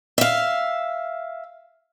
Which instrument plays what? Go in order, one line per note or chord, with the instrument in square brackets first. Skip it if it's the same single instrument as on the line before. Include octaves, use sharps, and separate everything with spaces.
[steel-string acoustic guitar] E5 F5